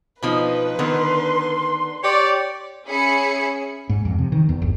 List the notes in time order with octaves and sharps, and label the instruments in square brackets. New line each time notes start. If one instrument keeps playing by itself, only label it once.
[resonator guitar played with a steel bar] B2 F3 D#4 [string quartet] B4
[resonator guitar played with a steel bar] D3 D#3 B3 [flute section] C6
[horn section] G4 C#5 D5
[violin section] C#4 G#4 E5 B5 C#7
[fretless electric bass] G#2
F2
C3
D#3
E2
G1